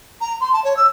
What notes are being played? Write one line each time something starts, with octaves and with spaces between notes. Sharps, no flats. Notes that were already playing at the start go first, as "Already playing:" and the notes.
A#5
C6
A5
C#5
E6